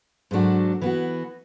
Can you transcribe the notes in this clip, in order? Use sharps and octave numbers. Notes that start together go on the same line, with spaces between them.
G#2 F#3 A3 D4 F#4
E3 B3 F#4